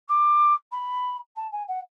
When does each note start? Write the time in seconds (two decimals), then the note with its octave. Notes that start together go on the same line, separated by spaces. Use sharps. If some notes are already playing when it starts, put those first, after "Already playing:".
0.08 D6
0.72 B5
1.36 A5
1.52 G#5
1.68 F#5